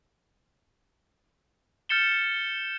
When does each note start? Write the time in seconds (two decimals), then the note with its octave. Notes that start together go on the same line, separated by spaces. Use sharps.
1.89 F6 G6 A6 C#7 E7 G7